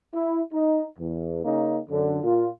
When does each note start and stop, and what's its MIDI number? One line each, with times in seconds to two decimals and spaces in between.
0.14 0.42 64
0.53 0.83 63
0.98 1.42 40
1.45 1.79 49
1.45 1.79 58
1.45 1.79 61
1.45 1.79 63
1.90 2.22 42
1.90 2.22 50
2.24 2.49 46
2.24 2.49 65